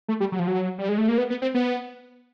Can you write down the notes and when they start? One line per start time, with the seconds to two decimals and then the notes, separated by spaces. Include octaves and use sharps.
0.08 A3
0.20 G3
0.32 F#3
0.39 F3
0.48 F#3
0.78 G3
0.89 G#3
0.98 A3
1.08 A#3
1.18 B3
1.30 B3
1.42 C4
1.54 B3